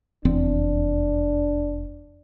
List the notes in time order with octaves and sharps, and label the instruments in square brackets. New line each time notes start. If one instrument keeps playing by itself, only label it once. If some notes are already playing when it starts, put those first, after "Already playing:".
[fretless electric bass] F1 E2 C4 [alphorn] D4